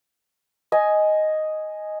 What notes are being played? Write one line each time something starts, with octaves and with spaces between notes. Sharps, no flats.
D#5 G#5